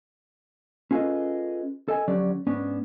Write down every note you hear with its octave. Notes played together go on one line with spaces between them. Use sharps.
C#4 F4 G#4 A4 B4 D#5
A4 D#5 G#5
F2 D3 F#3 C#4 G4 D5
G#2 B3 C#4 D4